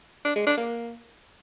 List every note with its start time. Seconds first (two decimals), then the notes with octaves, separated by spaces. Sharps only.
0.25 D4
0.36 G#3
0.46 D4
0.57 A#3